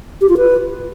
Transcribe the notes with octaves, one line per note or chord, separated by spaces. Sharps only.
G4
F4
B4